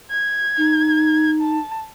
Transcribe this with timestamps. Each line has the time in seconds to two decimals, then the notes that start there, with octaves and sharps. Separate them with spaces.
0.11 G#6
0.57 D#4
1.41 A5